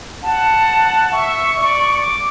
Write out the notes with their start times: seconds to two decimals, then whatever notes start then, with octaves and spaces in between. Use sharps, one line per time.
0.23 F#5 A5
1.12 E5 C#6
1.57 D5
2.01 D6